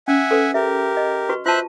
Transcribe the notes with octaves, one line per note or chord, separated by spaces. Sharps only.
C#4 E5 F#5 G#5
A4 B4
G4 A#4 E5
D#5
F#4 B4 C#6
F4 C5 E5 A5 F#6